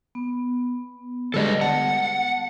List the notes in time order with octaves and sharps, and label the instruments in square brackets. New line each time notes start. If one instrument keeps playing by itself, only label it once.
[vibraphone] B3
[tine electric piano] D3 G3 G#3 [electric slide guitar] A4 B4 D#5
[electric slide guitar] F#5 [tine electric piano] A5